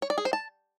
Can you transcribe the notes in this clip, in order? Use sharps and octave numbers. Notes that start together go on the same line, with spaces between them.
C#5
D5
G#4
C5
A5